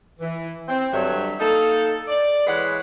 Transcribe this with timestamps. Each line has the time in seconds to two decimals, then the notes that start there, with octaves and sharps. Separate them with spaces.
0.20 E3
0.68 C4
0.91 G2 D3 F#3 C#5 E5
1.40 A#3 D#4 A4
2.08 D5
2.46 E3 G#3 B4 C#5 F#5